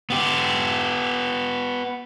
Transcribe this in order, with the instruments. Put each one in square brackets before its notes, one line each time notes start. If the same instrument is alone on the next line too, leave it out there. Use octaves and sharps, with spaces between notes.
[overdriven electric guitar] B3 G4